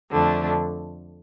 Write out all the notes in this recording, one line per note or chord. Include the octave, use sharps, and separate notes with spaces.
F2 D3 A3 D4